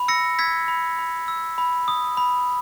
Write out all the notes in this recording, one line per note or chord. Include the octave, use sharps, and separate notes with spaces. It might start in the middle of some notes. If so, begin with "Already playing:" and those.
Already playing: B5
E6 A#6 C#7
E6 G#6 B6
B5
B5
E6
B5
D#6
B5